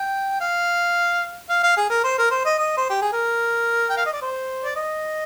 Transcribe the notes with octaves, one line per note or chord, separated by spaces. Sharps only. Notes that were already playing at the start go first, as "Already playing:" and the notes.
Already playing: G5
F5
F5
F5
G#4
A#4
C5
A#4
C5
D#5
D#5
C5
G4
G#4
A#4
G5
F5
D#5
D5
C5
D5
D#5